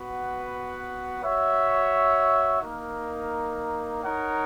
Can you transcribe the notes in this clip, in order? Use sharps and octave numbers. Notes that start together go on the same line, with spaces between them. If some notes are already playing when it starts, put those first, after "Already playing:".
Already playing: B3 F#4 B4 F#5
F#4 C#5 E5
A#3 D#4 A#4
D#4 A#4 C#5 F#5